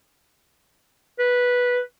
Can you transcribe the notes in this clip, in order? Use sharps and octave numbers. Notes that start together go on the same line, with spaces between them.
B4